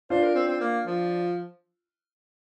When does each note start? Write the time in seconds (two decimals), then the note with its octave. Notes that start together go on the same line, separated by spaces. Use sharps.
0.10 D4 F4 C5
0.23 A#4
0.35 C4
0.48 C4
0.61 A#3
0.87 F3